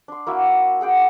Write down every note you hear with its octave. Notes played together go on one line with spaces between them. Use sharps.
D4 C6
A#3 E4 F#4
G#4 F#5 G5 D6